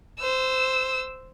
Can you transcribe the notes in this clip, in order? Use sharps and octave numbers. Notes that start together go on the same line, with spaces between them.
C5 E6